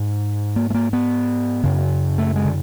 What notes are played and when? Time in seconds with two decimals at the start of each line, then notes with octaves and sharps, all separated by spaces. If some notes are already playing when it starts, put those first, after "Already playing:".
Already playing: G#2
0.56 A#3
0.70 A3
0.74 A#3
0.93 B3
1.64 F#2 C#3
2.18 A3
2.36 G#3
2.45 D3